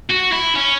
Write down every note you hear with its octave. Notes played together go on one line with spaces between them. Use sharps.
F#4
E4
C#4